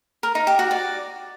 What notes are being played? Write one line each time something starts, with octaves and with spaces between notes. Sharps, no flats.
A#4
D#4
G4
F#4
D5